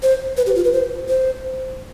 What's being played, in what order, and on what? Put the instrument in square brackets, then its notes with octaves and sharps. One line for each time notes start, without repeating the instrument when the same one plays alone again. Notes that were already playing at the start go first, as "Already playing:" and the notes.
[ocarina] C5
B4
G4
F4
B4
C5
C5